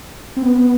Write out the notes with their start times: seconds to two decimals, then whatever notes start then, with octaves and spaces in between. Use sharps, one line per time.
0.36 C4
0.42 B3